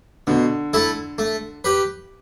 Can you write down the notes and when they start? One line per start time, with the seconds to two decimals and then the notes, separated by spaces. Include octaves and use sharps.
0.27 B2 D3
0.73 A3 E4 A4
1.18 A3
1.64 G4 B4